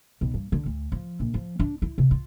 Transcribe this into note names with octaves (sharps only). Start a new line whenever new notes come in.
B1
G2
D3
D2
F3
A#1
F3
D4
E4
C3
F4